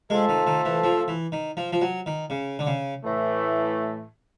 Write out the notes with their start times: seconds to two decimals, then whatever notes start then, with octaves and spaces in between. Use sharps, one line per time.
0.10 G#3 A3 C4 F4 A4
0.29 D#3
0.47 D#3
0.65 E3
0.84 F3
1.08 E3
1.32 D#3
1.57 F3
1.73 F3
1.82 F#3
2.06 D#3
2.30 C#3
2.59 D3
2.67 C#3
3.03 A2 E3 A3